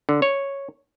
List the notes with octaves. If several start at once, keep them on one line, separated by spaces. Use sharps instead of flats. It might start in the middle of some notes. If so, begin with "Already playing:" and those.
D3
C#5